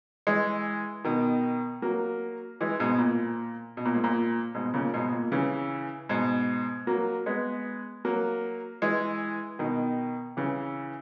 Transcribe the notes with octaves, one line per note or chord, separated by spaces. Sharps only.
E3 G#3
B2 D#3
F#3 A#3
E3 G#3
G#2 B2
A#2
B2
A#2
G#2
A#2
G#2 B2
A#2 C#3
G#2 B2
A#2
C#3 E3
G#2 B2
F#3 A#3
G#3 B3
F#3 A#3
E3 G#3
B2 D#3
C#3 E3